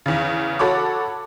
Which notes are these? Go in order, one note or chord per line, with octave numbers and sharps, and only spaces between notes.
E2 C#3
F#4 A4 C#5 B5 D6